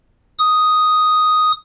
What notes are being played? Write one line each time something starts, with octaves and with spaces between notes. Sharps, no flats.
D#6